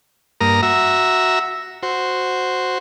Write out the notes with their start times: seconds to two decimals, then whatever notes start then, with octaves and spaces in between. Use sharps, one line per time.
0.41 G2 A#3 A#4 A#5 D#6
0.63 F#4 E5 A#5 E6
1.83 F#4 C5